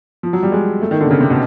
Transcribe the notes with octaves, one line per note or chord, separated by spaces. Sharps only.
F3
F#3
G3
G#3
A3
D#3
D3
C3
C#3
C3
B2